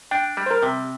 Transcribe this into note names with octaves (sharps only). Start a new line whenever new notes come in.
D4 G5
G3
C5
A#4
C3